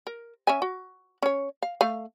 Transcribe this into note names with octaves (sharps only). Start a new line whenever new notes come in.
A#4
C#4 E5 G#5
F#4
C#4 C#5
F5
A3 F5